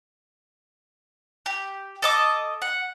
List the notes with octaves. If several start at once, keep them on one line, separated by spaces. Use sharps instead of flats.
G4
A4 D#5 D6
F#5